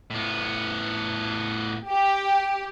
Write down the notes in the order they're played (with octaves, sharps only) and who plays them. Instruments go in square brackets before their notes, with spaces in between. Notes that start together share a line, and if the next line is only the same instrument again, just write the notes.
[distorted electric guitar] A2 B3
[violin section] G4